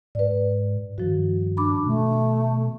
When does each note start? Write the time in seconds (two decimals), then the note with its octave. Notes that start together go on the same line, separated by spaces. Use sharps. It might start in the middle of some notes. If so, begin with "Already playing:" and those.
0.15 G#2 B4 D5
0.98 G2 D#3 F3 F#4
1.57 D4 B5 D6
1.86 B2 A3